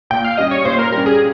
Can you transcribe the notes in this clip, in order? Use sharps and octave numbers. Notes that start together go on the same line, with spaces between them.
A#2 G5
F5
G3 C#4 D#5
C#5
A#2 C5
A#4
G3 C#4 A#4
G#4